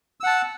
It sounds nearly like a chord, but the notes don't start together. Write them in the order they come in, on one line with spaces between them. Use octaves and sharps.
E6 F#5 A5